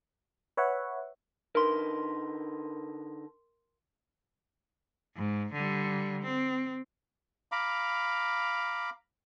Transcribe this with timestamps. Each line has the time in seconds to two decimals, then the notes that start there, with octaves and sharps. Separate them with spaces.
0.57 B4 C#5 E5 F#5
1.55 D3 D#4 A#4 B4 C6
5.16 G#2
5.53 D3 G3
6.23 C4
7.52 F5 A#5 B5 D6